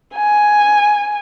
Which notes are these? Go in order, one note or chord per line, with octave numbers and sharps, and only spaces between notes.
G#5